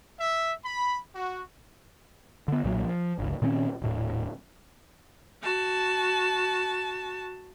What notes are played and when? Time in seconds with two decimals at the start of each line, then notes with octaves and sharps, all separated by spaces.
0.19 E5
0.63 B5
1.15 F#4
2.48 D3 B3
2.64 B1 A#2 F#3
2.84 F3
3.18 G1 C#2
3.42 A#2 D#3 C4 C#4
3.82 D#1 A2
5.43 F#4 A5